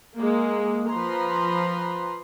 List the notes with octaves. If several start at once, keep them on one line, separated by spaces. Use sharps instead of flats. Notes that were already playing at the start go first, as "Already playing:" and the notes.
G#3 A#3
F3 B4 A#5 C6